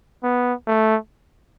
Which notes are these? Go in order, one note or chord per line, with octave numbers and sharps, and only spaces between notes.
B3
A3